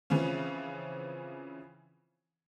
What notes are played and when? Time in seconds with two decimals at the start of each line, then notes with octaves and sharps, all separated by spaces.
0.10 C#3 E3 F3 C4 C#4